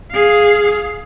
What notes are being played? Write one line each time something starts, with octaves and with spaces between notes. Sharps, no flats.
G#4 F5